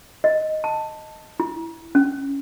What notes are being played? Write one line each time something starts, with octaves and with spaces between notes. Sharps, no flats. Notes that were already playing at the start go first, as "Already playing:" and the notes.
D#5
A5
E4
C#4